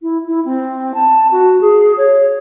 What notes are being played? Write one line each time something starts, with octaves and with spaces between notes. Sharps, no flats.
E4
E4
C4
A5
F#4
G#4
C#5